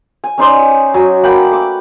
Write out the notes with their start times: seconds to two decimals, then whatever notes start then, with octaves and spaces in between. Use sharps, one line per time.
0.24 G#5
0.38 C#4 D#4 C5 D5
0.94 F#3 G#5
1.23 A#3 B4 F#5 G5
1.51 A3 D6